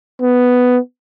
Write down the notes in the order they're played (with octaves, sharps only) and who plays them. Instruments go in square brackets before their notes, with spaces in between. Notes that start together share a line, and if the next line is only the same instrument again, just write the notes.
[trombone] B3